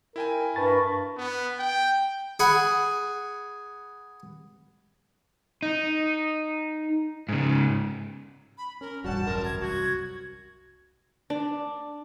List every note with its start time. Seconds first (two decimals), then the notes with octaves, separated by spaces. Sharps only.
0.16 E4 A#4 G5 G#5
0.56 G2 A#4 B4 A5 B5 C#6 A6
1.17 B3
1.59 G5
2.40 G#4 F#5 B5
5.62 D#4
7.29 G#2 C#3
8.58 B5
8.81 C#4 A#4
9.04 E1 A1 G2 G3 F#4 F#5 A5
9.27 F#2 A#4
9.45 G#6
9.62 C2 F#4 G#6
11.30 D4